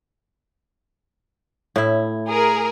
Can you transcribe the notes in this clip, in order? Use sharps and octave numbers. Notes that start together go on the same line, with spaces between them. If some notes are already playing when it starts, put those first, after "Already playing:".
A2 E4
G#4 A#4